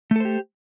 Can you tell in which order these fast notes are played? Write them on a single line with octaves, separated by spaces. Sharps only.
A3 A4 C5 G4